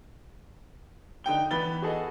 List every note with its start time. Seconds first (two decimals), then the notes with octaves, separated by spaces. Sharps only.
1.24 D3 D#4 G5 G7
1.51 E3 B3 B5 A6 G7
1.82 F#4 G#4 A4 B4 D#5